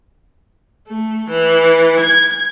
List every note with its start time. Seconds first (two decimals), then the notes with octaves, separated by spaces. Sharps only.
0.89 A3
1.29 E3
2.00 G#6